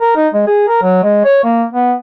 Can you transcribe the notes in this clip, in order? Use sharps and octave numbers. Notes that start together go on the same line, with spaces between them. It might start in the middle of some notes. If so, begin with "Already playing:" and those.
A#4
D#4
G#3
G#4
A#4
F#3
G#3
C#5
A#3
B3